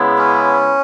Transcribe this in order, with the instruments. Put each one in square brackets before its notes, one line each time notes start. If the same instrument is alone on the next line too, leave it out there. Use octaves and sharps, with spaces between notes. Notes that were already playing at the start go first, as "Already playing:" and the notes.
Already playing: [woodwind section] C#3 G#3 B3 E4
[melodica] C#4